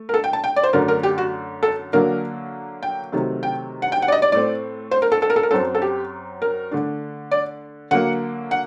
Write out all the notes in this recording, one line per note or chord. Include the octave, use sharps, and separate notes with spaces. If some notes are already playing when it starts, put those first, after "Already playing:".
Already playing: A3
A#4
A4
G5
A5
G5
D5
C5
F#2 D3 A3 D4 A#4
A#4
G4
F#4
A4
D3 F#3 A#3 D4 A#4
G5
C3 D#3 F#3 A3
G5
F#5
G5
F#5
D5
D#5
D5
A2 A3 C4 D5
C5
A#4
A4
A4
A#4
A4
A#4
F#2 F#3 C4 A4
A4
G4
A#4
D3 A3 D4
D5
D3 F#3 A#3 F#5
F#5